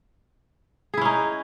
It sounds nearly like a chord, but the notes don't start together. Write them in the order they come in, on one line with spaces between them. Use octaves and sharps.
G#4 E4 C#4 D#4